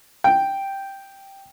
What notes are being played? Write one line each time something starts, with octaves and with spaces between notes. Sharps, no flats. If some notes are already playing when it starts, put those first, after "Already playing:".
G5